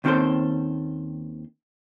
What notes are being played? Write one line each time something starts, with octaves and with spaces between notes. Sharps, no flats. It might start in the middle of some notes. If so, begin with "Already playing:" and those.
D#2 D#3 C4 C#4 A4 C5